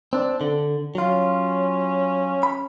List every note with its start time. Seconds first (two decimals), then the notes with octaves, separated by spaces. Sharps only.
0.13 C4 D4
0.41 D3
0.95 F#3 C#4 F4
2.43 B5